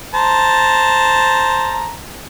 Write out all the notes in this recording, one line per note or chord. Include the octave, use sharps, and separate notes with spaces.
C5 A5 A#5